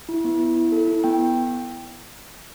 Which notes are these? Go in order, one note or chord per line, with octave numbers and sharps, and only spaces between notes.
E4
B3
E4
E4
A4
E4
B3 G5